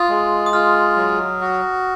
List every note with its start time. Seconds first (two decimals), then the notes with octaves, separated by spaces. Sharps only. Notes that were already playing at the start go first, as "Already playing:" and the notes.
Already playing: F4 D#6
0.09 G#3
0.46 D#6
0.53 F4 F6
0.96 F#3
1.41 F#4